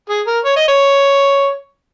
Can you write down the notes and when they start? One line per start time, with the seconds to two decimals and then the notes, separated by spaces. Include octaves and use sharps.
0.09 G#4
0.27 A#4
0.45 C#5
0.56 D#5
0.68 C#5